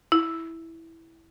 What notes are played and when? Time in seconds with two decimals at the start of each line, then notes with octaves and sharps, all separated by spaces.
0.12 E4